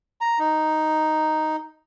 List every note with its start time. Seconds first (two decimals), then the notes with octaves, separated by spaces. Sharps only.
0.21 A#5
0.39 D#4